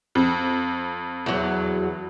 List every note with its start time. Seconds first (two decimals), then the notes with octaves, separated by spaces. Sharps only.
0.15 F2
1.26 E2 F#3